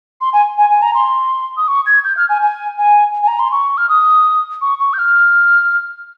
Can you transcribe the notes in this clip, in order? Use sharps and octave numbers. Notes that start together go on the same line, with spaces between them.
C6
G#5
G#5
G#5
A#5
C6
D#6
C#6
G#6
G6
F6
G#5
G#5
G#5
G#5
A#5
C6
C#6
F6
D#6
C#6
C#6
G6
F6